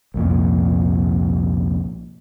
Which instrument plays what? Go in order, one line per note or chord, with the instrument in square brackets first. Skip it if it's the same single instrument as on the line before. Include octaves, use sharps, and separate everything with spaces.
[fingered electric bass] C2 F2 A#2